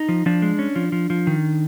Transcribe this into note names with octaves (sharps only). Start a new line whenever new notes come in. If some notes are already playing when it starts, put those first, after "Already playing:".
Already playing: D#4
F3
F3 D4
G#3
C#4
F3
F3
F3
D#3